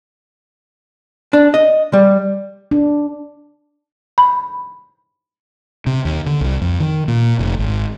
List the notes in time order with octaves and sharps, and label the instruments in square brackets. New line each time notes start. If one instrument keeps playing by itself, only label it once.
[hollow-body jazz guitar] D4
D#5
G3
[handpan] D4
[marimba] B5
[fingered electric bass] C3
D#2
D3
C2
F2
D#3
A#2
F1
G#1